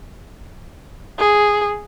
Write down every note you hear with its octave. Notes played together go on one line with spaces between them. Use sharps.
G#4